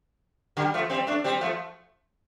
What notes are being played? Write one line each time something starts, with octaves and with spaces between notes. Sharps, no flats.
D3 G3
F3 A3
G3 C4
A3 D4
G3 C4
F3 A3